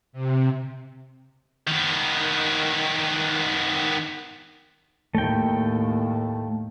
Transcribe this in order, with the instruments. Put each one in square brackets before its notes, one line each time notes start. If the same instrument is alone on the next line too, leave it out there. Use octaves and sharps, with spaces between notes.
[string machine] C3
[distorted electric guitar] D#3 B3
[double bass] D#2 A2 [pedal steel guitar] A3 G5